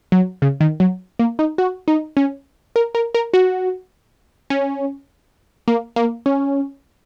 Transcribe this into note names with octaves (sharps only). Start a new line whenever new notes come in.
F#3
C#3
D#3
F#3
A#3
D#4
F#4
D#4
C#4
A#4
A#4
A#4
F#4
C#4
A#3
A#3
C#4